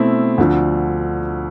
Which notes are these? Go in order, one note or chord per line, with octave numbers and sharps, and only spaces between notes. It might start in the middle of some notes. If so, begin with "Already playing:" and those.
Already playing: B2 A3 C4 E4
D2 D3 F3